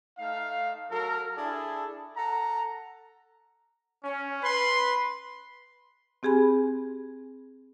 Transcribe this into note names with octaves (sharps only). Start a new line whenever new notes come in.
A3 D#4 F5
F#3 A4 A#4
D4 E4 G#4 A4
A4 F#5 A#5
C#4
B4 B5 C6
C4 G4 G#4 G#5 B5